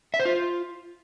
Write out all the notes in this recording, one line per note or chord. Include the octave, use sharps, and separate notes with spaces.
E5
C5
F4